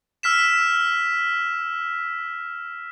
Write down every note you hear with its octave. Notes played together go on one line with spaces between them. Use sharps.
E6 F6 B6 E7